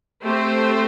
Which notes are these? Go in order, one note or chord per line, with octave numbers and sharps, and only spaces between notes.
A3 C4 G4 C5